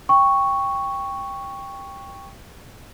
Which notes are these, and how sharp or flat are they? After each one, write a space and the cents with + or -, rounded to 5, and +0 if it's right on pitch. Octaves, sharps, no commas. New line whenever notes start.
G5 +10 C#6 +0